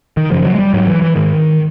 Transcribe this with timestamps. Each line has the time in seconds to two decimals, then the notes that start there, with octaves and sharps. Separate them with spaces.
0.17 D#3
0.31 F#2 C#3 F3
0.45 F#3
0.55 G#3
0.59 G3
0.74 G#2 F#3
0.87 E3
1.02 E3
1.16 G#2 D#3